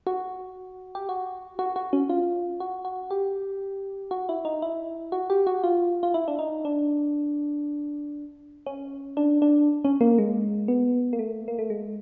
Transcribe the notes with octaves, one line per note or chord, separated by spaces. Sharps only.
F#4
G4
F#4
F#4
F#4
C#4
F4
F#4
F#4
G4
F#4
E4
D#4
E4
F#4
G4
F#4
F4
F4
E4
D4
D#4
D4
C#4
D4
D4
C#4
A#3
G#3
B3
A#3
A3
A#3
A3
G#3